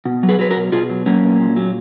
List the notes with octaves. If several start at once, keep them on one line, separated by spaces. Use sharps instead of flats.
B2
F#3
G#4 B4
F#3 B4
F#4 A#4
B2
B2 F4 G#4
F#3
F#3 A#3 C#4
B2
A#2
F#3